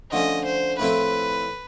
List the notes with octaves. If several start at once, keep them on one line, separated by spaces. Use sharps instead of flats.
D3 F3 A3 C#4 D#5
C5
A2 F3 A3 C4 E4 B4